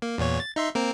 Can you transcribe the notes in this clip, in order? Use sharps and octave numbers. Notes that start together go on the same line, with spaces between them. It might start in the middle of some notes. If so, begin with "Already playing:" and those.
A#3
E2 A#2 C#5
A6
D#4 E5 C6
A#3 C4 A#4